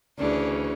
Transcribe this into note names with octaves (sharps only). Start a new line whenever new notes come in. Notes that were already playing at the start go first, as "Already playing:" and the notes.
D2 C#3 E3 D4